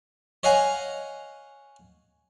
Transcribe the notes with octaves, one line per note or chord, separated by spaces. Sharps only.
C#5 D#5 F5 F#5 G#5 A#5